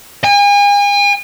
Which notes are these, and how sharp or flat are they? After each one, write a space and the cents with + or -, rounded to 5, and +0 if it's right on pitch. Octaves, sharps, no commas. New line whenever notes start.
G#5 -40